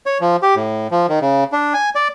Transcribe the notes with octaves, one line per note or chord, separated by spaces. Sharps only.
C#5
F3
G4
A2
F3
D#3
C#3
D4
G#5
D5